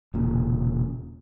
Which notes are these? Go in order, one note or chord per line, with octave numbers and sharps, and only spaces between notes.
E1 A#2 C#3